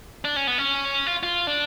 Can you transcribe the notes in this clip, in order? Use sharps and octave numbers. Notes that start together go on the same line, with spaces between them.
D4
C#4
B3
C#4
F4
F4
D4